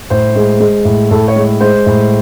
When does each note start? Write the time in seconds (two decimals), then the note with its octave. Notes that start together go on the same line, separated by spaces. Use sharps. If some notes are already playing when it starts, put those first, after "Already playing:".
0.10 A2 C5
0.36 G#3
0.60 G#3
0.85 A2
1.11 A2 A4
1.28 C#5
1.36 G#3
1.60 G#3 C5
1.86 A2